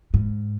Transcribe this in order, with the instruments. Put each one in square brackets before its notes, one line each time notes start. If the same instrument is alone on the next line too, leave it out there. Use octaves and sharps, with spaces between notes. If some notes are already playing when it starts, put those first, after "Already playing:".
[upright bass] G#2